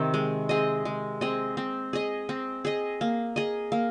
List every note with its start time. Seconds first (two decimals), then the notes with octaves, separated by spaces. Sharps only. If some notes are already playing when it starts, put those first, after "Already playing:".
Already playing: C3 D#3 C4
0.14 G#3
0.49 C4 G#4 D#5
0.85 G#3
1.21 C4 G#4 D#5
1.57 C4
1.93 G#4 D#5
2.29 C4
2.65 G#4 D#5
3.01 A#3
3.36 G#4 D#5
3.72 A#3